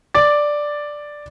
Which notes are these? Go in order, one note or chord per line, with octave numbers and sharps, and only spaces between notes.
D5 D6 A6